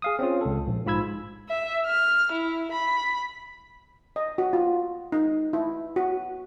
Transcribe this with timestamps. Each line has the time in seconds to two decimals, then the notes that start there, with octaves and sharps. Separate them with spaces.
0.02 G#4 F5 D#6
0.19 C4 C#4 F4
0.41 C#2 A4
0.67 A#1
0.86 G#2 F4 B5 E6 G#6
1.49 E5
1.86 F6
2.32 E4
2.72 B5
4.16 D#5
4.38 F#4
4.53 F4
5.12 D#4
5.53 E4
5.96 F#4